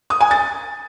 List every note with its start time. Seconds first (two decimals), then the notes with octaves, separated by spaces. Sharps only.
0.10 D#6
0.21 G#5
0.31 A6